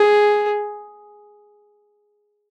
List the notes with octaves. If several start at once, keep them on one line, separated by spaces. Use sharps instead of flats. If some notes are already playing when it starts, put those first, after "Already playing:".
Already playing: G#4